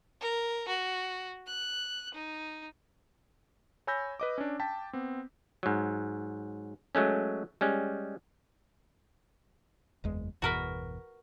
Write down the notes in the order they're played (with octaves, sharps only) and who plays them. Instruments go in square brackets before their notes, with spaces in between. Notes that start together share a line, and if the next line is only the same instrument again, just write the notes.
[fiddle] A#4
F#4
F#6
D#4
[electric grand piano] C#5 G#5 B5 E6 G6 A#6
B4 D#5 D6
C#4 D4
G5 A5 B6
B3 C4
[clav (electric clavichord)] G#2 F#3
F#3 G#3 A3 C#4
G3 G#3 C#4
[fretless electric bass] F#1 E2 G#3
[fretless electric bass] G1 E2 B2 [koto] F#4 A#4 B4